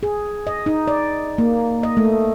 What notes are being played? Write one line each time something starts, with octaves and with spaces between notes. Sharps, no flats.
G#4
D#5
D#4
D5
A#3
D#5
A3